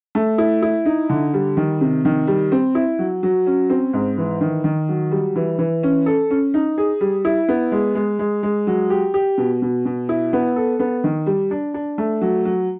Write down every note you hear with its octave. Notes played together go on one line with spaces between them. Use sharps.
A3
E4
E4
D#4
D3
G3
D#3
C3
D#3
G3
C4
E4
F#3
F#3
C#4
C4
G#2
E3
D#3
D#3
F#3
G3
E3
E3
C#4
A4
C#4
D#4
G#4
G3
E4
B3
G#3
G#3
G#3
G#3
F#3
G4
G4
B2
B2
B2
E4
B3
A4
B3
D#3
G3
D4
D4
A3
F#3
F#3